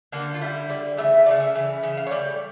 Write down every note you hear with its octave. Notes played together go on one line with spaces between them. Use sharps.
D3 G3 A#3
F4
D3 G3 E4
D3 G3 D5
C#3 E3 A3 E5
C#3 E3 A3 D5
E5
C#3 E3
C#3 E3
F5
C#5
A2 G3 D5